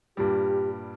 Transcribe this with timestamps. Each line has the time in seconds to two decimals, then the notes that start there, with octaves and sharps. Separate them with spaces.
0.17 G2 A#2 G3 G4